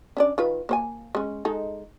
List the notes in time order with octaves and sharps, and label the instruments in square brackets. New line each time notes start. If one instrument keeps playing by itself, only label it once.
[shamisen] C#4 D4 D5
D#3 F4 B4
A#3 C5 G#5
G#3 C#4
G#3 D#4 A4